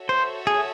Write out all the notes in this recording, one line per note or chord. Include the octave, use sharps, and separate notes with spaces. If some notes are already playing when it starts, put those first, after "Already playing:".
Already playing: F#4 A4 C#5 E5
C5
G#4